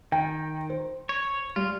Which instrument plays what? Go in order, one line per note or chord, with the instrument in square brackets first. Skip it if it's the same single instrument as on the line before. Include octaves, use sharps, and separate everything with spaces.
[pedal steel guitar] D#3 [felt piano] G5
[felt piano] C5
[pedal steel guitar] C#5
[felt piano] G3 [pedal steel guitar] F4